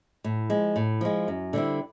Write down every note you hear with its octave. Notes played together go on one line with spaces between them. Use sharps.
A2
F3 G#3
A2
F3 G#3
F#2
D3 G3 C4 E4